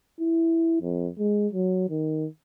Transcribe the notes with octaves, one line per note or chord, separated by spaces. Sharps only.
E4
F2
G#3
F#3
D#3